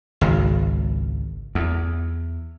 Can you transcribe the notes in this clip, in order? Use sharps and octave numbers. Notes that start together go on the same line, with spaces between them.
G#1 C#2
E2